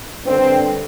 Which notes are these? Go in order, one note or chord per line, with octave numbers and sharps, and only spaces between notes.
G2 D3 C4